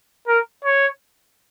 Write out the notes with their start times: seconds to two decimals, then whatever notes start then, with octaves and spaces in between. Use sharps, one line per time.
0.28 A#4
0.65 C#5